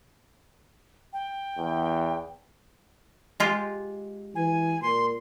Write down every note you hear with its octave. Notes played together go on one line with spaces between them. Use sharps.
G5
E2
G#3 F4 G4
E3 G#5
A#2 C6